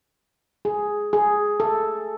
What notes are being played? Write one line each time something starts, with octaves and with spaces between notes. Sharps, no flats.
G#4
G#4
A4